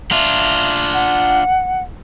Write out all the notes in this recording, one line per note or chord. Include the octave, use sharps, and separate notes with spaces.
D4 F4 E5
F#5